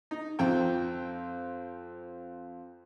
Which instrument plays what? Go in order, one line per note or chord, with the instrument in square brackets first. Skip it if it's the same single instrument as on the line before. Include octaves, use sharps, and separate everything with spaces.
[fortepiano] D#4
F2 C4 G5